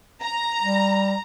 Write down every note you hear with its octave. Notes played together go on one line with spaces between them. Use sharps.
A#5
G3